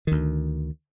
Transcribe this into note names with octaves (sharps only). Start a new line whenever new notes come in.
D2 D#3